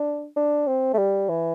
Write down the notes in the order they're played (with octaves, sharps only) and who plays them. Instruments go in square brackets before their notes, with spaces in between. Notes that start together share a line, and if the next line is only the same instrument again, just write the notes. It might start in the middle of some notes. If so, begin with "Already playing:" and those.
Already playing: [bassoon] D4
D4
C4
A3
G3
E3